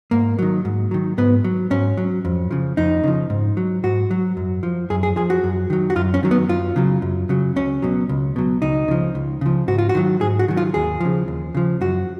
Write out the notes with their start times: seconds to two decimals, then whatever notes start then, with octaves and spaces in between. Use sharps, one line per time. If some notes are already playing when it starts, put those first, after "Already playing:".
0.11 G#2 A#3
0.39 D#3 F#3
0.65 G#2
0.91 D#3 F#3
1.18 G#2 B3
1.44 F#3
1.70 G#2 C#4
1.97 F#3
2.25 F2
2.51 C#3 F3
2.77 F2 D#4
3.04 C#3 F3
3.30 G#2
3.57 F#3
3.83 G#2 F#4
4.11 F#3
4.37 F#2
4.63 F3
4.90 F#2 G#4
5.03 G#4
5.16 F3 G#4
5.30 F#4
5.44 F#2
5.70 D#3 F#3
5.90 F#4
5.96 F#2 F4
6.14 C#4
6.23 D#3 F#3
6.31 B3
6.49 F#2 F4
6.76 C#3 F#3
7.02 F#2
7.29 C#3 F#3
7.56 C#2 C#4
7.82 B2 F#3
8.09 C#2
8.36 B2 F#3
8.62 C#2 D#4
8.88 C#3 F3
9.15 C#2
9.41 C#3 F3
9.68 G#2 F#4
9.78 F4
9.89 F#4
9.95 D#3 F#3
10.21 G#2 G#4
10.39 F#4
10.48 D#3 F#3
10.57 F4
10.74 D#2 G#4
11.01 C#3 F3
11.28 D#2
11.54 C#3 F3
11.81 F#2 F#4